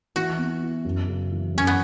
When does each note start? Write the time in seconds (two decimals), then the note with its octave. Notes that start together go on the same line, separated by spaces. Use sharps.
0.16 E3 F#4
0.38 B3
0.62 E4
0.85 F#2
1.08 C#3
1.32 E3
1.55 F#2 C#4
1.67 B3